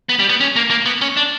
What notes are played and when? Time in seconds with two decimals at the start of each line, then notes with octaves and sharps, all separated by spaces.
0.09 B3
0.19 G3
0.29 B3
0.40 C#4
0.56 A#3
0.70 A#3
0.86 B3
1.01 C#4
1.17 D4